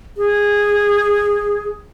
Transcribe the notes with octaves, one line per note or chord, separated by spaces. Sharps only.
G#4